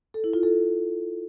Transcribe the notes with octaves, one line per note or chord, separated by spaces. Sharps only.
A4
E4
F4
A4